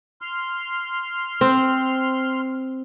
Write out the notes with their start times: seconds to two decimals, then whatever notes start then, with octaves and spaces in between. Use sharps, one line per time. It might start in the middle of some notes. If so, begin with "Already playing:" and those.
0.22 C6 F6
1.41 C4